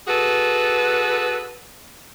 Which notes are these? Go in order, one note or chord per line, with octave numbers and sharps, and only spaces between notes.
F#4 G#4 A4 B4